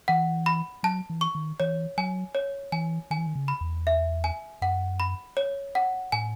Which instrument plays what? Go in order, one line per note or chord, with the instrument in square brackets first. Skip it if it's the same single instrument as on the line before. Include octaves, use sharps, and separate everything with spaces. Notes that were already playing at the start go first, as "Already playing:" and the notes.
[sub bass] E3 [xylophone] F#5
[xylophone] B5
[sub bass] F#3 [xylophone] A5
[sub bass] E3
[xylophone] C#6
[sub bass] D#3
[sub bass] E3 [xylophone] C#5
[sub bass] F#3 [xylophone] G#5
[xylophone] C#5
[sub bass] E3 [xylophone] G#5
[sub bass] D#3 [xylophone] G#5
[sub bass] E3
D#3
C#3
[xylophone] B5
[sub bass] E2
[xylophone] E5
G#5
[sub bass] F#2 [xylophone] F#5
[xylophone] B5
C#5
F#5
[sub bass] A2 [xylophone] G#5